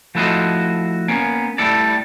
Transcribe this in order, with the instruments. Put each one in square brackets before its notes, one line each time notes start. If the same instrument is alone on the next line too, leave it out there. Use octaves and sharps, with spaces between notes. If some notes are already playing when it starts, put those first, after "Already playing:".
[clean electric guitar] F3 A3 E4 F#4 C5 D#5
A#3 B3 C#4
G3 A3 E4 A4 D5